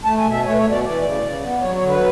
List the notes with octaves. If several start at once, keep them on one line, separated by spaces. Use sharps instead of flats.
A3 A5
G#5
B2
E5
A3 C#5
B4
C#5
B2
D5
E3 D5
C#3
C#3
B3
F#3 C#5
C#5
D3
B4